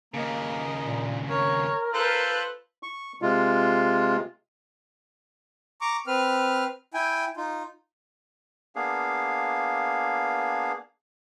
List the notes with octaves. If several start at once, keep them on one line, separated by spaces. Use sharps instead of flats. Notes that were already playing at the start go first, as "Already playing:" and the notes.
D#2 C#3 A#3 A#4 D#5
A#2
A#4 C#5
F4 A4 B4 C5 F#6
C#6
C3 G#3 F4
A#5 C#6 D6
C4 B4 F6
E4 G5 G#5
D#4 F4
A#3 B3 D4 G#4 F5